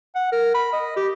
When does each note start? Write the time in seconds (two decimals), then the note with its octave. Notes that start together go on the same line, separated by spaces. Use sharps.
0.15 F#5
0.32 A#4
0.54 B5
0.73 D#5
0.97 G4